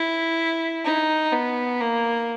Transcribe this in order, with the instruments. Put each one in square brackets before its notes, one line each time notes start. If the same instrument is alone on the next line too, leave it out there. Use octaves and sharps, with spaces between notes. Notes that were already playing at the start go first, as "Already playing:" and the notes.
Already playing: [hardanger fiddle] E4
D#4
B3
A#3